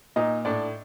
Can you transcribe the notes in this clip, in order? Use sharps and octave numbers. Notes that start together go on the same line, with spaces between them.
A#2 D#4 D#5
A2 D4 D5